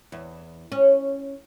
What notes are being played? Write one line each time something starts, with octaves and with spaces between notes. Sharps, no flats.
E2
C#4